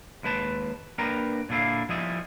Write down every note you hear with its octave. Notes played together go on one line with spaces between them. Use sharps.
D#2 G#3 B4 A5
A#3 D4 A#4 B4 G5 A#5
A#2 D3 D4 E4 F5
F3 G3 E4 G#4 D#5 E5